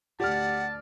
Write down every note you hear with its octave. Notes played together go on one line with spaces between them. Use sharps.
D2 G4 D5 F#5 A5 F6